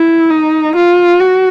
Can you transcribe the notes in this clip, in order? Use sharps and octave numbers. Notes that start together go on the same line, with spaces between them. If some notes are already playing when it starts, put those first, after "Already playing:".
Already playing: E4
D#4
F4
F#4